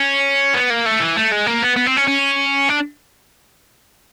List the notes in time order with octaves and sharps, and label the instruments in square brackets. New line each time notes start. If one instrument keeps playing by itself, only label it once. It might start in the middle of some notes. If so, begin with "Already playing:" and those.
Already playing: [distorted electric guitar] C#4
B3
A#3
A3
E3
A3
G#3
A#3
B3
B3
C4
C#4
C#4
D4